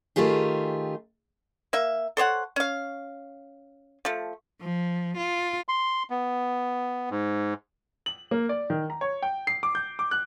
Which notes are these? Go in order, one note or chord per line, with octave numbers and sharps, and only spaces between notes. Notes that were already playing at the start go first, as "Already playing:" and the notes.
D#3 A3 F4 G4 G#4
A#3 E5
A4 C5 C#5 F#5
C#4 F5
F3 A3
F3
F4
C6
B3
G#2
F#7
A#3
D5
D#3
A#5
C#5
G5
C7
D6
G6
D6
F#6